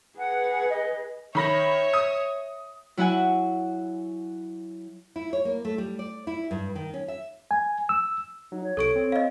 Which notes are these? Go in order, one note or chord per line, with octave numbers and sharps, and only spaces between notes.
G#4 B4 F#5
D#5
D#3 C#5 E5 B5 A#6
D#6
F#3 E4 F#4 F#5 G#5
E4
C#5
A#3
A3
G3
D5
E4
G2
D#3
C#4
E5
G#5
E6
F#3 D#4
C#5
C2 A4 C#6 D7
C4
D#5 F5